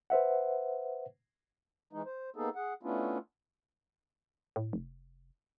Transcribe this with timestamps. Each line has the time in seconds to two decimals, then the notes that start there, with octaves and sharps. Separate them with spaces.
0.10 B4 C5 E5 F#5
1.93 E3 G#3 D#4
2.05 C5
2.36 A#3 B3 D#4 G#4 A4
2.56 G#4 F#5
2.83 A3 B3 C#4 D4 E4 F4
4.56 A2
4.73 F1